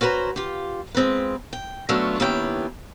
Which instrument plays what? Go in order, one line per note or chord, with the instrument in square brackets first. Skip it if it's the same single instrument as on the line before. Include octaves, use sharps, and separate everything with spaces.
[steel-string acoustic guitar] C#4 F#4 B4 C5 A#5
F4 G4
G#3 C4 F4 B4
G5
F#3 A3 B3 C#4 D4 F4
D#2 B3 C#4 D4 E4 G5